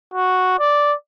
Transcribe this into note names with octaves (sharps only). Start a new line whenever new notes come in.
F#4
D5